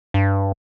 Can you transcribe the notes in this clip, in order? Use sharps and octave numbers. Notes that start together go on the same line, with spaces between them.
G2